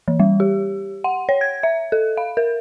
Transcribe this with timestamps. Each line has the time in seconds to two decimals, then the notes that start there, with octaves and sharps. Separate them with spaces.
0.08 E3
0.20 G3
0.40 G4
1.04 F#5
1.29 C#5
1.41 G#6
1.63 E5
1.92 A4
2.17 F5
2.37 A#4